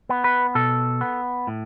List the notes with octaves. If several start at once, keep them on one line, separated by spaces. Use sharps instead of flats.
B3
B4
B2 A4
B3
A2